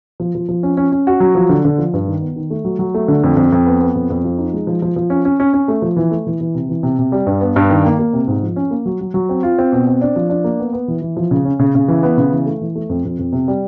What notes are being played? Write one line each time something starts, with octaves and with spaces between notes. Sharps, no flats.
F3
F3
F3
C#4
C#4
C#4
F#4
F#3
F3
D3
D3
F3
G2
D#3
B3
D#3
A3
F#3
F#3
A3
D3
F2
F2
F2
B3
B3
F2
F2
F3
D#4
G#3
F3
F3
F3
C#4
C#4
C#4
C#4
A3
F3
E3
A3
E3
E3
C3
E3
C3
C3
G3
G2
B3
G2
D#3
A#3
A#3
C3
G#2
F3
C#4
A#3
F#3
F#3
F#3
C4
F4
C4
B2
C4
D4
F3
D4
A#3
B3
B3
E3
E3
F3
C#3
C#4
C#3
C#3
E3
B3
C#3
E3
A3
E3
A3
F2
F2
F2
C3
G3